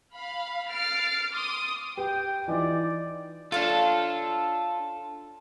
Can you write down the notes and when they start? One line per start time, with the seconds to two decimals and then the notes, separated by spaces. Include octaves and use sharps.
0.14 F5 B5
0.69 F6 A6 C7 D7
1.32 C6 D6 D#6
1.97 G4 B4 G5
2.48 E3 D#4 F4 D5
3.52 D4 F4 A4 C#5 F5 A5